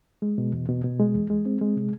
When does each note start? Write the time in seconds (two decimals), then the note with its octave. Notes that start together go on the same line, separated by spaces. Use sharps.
0.22 G#3
0.38 B2
0.53 E2
0.69 B2
0.84 B2
1.00 G#3
1.15 E2
1.30 G#3
1.46 C4
1.61 G#3
1.76 C3